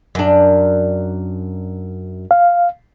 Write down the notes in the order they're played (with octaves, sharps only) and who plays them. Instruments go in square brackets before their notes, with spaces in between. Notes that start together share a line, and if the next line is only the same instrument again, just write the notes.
[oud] F#2 D4
[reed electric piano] F5